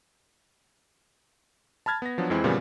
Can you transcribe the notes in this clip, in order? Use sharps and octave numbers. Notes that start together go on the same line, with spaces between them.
A5 B5 F6 G#6 A6
B3 A#6
F3 F#3 B3 D4
F2 E3 G#3 C4 E4
A#2 C#3 E3 F3 G3 B3